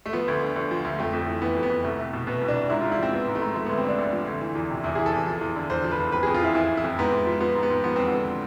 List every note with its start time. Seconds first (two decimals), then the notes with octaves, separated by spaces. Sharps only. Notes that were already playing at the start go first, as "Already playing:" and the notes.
0.06 A3
0.13 F3 B3
0.28 D2
0.42 D3
0.56 D2
0.71 F3
0.85 D2
0.99 F2 A3
1.13 F2
1.27 E3
1.41 E3 B3
1.57 F2
1.63 B3
1.70 F2
1.84 C2 A3
1.99 C2
2.13 B2
2.27 B2 B3
2.42 C2
2.48 D4
2.56 C2
2.70 G#2 E4
2.81 G#2 F4
2.92 E4
2.98 F3 C4
3.12 F3 B3
3.28 G#2
3.35 A3
3.42 G#2
3.55 F3 A3
3.66 D2 B3
3.78 C4
3.84 D3 D4
3.99 D2
4.12 F3
4.28 D2
4.42 E3
4.55 E2
4.70 C3
4.84 E2 E4
4.95 E3 G#4
5.06 A4
5.13 E2
5.27 F3
5.41 E2
5.56 D3
5.70 E2 C5
5.84 F3
5.91 B4
5.99 E2
6.12 F2 B4
6.23 F2 G#4
6.34 F4
6.42 E3 E4
6.55 E3 E4
6.70 F2
6.77 E4
6.84 F2
6.98 G#2 B3
7.12 G#2
7.26 F3
7.40 F3 B3
7.55 G#2
7.63 B3
7.70 G#2
7.84 F3 B3
7.96 E2 C4
8.08 D3 B3